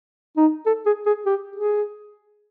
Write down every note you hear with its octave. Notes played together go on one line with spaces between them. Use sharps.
D#4
A4
G#4
G#4
G4
G#4